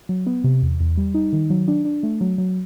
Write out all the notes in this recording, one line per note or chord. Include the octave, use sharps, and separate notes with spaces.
F#3
B3
C3
E2
E2
G3
D#4
D#3
F#3
D4
D4
A3
F#3
F#3